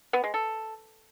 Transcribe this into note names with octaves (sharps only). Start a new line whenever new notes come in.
B3
G#3
A4